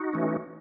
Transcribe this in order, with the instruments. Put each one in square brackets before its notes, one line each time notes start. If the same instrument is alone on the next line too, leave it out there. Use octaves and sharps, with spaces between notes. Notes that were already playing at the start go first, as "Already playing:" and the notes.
Already playing: [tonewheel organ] D#4 F#4
E3 A3 C#4